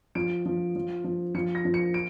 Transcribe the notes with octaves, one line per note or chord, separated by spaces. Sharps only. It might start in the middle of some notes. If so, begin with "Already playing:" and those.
F3 D7
F3
F3
F3
F3 C#7
A#6
F3
C#7
D7